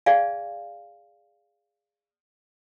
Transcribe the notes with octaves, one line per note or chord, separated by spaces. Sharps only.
G#4 D5 F5 G#5